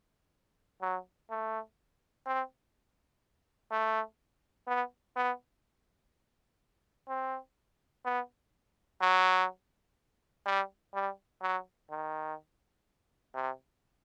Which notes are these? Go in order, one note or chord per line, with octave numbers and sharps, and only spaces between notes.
F#3
A3
C4
A3
B3
B3
C4
B3
F#3
G3
G3
F#3
D#3
C3